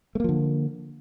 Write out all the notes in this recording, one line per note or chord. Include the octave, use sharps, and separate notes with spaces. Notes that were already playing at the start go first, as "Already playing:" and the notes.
D3 F3 A3 A#3